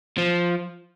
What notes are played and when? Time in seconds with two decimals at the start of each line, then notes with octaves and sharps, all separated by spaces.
0.18 F3